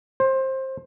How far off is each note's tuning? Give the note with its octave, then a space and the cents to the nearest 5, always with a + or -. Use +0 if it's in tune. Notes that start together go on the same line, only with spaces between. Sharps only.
C5 +20